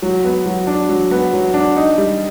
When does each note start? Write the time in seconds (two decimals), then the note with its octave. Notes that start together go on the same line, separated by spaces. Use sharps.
0.02 F#3
0.24 B3
0.46 F#3
0.67 D4
0.89 F#3
1.11 B3
1.33 F#3
1.54 D4
1.76 D#4
1.98 G3